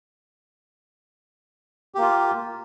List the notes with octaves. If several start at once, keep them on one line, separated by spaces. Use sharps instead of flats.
A#3 F4 G4